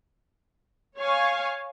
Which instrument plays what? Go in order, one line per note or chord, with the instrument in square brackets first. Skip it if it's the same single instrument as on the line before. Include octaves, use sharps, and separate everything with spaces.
[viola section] C#5 F5 G#5